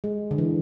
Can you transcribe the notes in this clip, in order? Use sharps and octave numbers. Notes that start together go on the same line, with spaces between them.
G#3
D3
E3